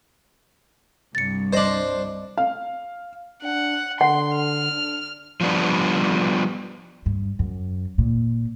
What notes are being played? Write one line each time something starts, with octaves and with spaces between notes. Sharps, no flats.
C2 G2 A6 C#7
D4 C5 D5 D#5 F#7
F5
D4 F#5
D3 F#5 C6
F6
D4
F3 G3 B3 D4
G2
F#2
A#2